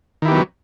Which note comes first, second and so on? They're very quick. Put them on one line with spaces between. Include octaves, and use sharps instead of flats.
D#3 E4 G4 B3 F#3